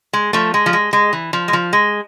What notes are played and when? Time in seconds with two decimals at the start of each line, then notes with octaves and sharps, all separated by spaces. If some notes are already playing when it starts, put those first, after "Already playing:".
0.13 G#3
0.33 F3 A3
0.54 G#3
0.66 F3
0.73 G#3
0.93 G#3
1.13 E3
1.33 F3
1.48 G#3
1.53 F3
1.73 G#3